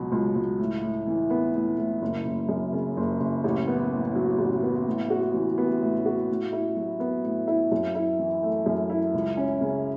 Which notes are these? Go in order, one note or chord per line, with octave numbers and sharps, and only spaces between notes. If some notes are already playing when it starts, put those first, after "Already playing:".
Already playing: C#2 B2 F#3
C#2
C#2
A2
A2
E3
B3
A2
A2
F#1
F#1
F#2
C#3
F#1
F#1
A1
B3
A2
F#3
A1
B3
A2
F#4
E3
B3
A2
F#4
A2
E4
F#3
B3
A2
E4
F#2
E4
E3
A3
F#2
E4
C#2
C#4
C#3